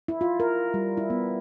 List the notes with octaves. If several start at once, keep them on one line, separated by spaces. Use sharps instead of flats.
E4
F4
A#4
G3
E4
B3